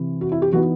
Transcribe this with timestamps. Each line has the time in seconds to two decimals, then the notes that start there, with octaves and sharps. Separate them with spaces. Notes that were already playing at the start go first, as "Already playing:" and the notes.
Already playing: C3 E3
0.21 F#4
0.32 E4
0.42 G4
0.53 E3 B3 D#4 F#4